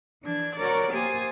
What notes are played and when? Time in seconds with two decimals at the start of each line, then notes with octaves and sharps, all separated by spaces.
0.24 E3 D4 G#6
0.57 F#4 A#4 C#5 D5
0.93 A#3 G4 C5 G#5 D#6 A6